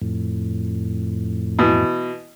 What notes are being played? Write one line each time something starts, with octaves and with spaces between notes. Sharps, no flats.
F2 A2
B2 E3